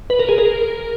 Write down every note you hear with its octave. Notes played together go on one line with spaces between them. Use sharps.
B4
A#4
G#4
A#4